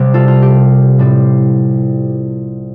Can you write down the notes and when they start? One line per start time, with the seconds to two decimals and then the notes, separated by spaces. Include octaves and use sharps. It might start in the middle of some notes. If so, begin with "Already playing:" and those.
Already playing: C2 C3 G3 C4 G4
0.14 F4 A4
0.28 F4
0.42 G4
0.98 A2 G3 C4